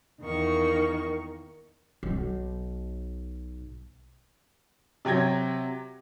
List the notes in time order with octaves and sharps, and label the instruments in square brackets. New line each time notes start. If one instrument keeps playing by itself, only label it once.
[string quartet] E2 D#3 A#3 C#6
[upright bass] B1 B2
[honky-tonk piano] C3 F#3 G5 G#6 A#6